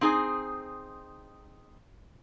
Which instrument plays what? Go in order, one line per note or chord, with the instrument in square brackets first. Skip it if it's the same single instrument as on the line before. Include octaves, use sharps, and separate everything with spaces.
[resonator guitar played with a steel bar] C4 D#4 G#4 D5 G#5